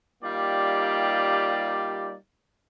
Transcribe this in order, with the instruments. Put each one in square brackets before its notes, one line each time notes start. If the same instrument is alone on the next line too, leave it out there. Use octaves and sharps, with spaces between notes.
[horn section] G3 A#3 D#4 F4 G4 D5